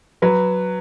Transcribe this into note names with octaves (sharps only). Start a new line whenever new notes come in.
F#3 B4